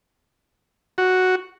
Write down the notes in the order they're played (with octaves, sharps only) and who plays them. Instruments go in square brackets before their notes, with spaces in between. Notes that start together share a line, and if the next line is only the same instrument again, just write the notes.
[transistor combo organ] F#4